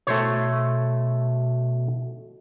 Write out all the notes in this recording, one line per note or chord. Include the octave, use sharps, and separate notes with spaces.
B2 A3 C5 C#5